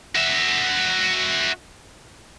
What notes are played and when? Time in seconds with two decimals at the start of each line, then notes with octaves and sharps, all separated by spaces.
0.16 F#4 E5